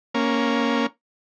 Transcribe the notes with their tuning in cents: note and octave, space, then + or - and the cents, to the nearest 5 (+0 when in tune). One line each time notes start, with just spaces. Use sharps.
A#3 +0 C#4 +0